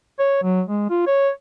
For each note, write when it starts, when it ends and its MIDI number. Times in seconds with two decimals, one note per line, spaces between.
0.19 0.38 73
0.43 0.62 54
0.67 0.86 56
0.90 1.03 65
1.07 1.29 73